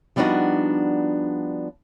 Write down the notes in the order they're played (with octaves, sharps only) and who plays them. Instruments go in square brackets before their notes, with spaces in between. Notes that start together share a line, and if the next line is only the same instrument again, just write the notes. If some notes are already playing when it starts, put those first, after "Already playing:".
[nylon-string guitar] F3 G3 B3 D4 D#4 F#4